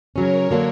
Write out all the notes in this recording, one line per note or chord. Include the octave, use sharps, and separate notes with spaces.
C#3 F#3 C#4 A#4 C#5
D3 F#3 A#3 D4